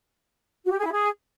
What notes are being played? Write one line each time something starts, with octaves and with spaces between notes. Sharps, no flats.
F#4
G4
G#4
E4
G#4